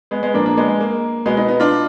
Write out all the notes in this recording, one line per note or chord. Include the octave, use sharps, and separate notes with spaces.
G#3 B3
G#3 B3
A#2 F3 A#3 D4
A#3 D4
G#3 B3
G#3
A#3
B2 G#3 B3
B3 D#4
B3 D#4
D4 F4